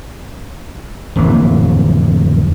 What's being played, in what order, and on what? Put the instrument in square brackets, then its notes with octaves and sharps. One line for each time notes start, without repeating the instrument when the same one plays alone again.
[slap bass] D1 F2 E3 A#3